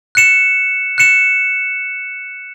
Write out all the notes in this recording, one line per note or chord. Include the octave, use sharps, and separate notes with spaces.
F#6 C#7 E7
F#6 C#7 E7